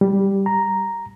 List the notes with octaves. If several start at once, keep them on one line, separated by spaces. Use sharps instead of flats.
G3
A#5